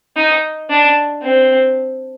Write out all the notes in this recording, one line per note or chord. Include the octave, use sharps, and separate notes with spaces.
D#4
D4
C4